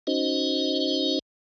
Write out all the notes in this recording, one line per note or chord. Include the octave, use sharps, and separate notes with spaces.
C#4 D#4 F#4 C5 D#5